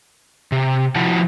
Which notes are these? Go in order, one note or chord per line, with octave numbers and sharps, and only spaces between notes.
C3
F3 E4 F#4 F#5 A5